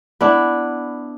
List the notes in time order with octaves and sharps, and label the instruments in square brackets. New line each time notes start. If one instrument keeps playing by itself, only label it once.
[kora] B3 D4 E4